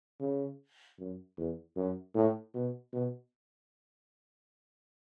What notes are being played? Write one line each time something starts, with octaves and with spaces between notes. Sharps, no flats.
C#3
F#2
E2
F#2
A2
B2
B2